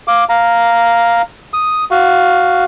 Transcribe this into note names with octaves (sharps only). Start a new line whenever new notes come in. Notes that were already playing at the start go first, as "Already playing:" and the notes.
F5 D6
F5 A#5
D#6
F#4 F5